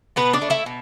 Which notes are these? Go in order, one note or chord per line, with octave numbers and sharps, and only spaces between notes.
B2 B3 B4
D4 D5
A3
E4 E5
B2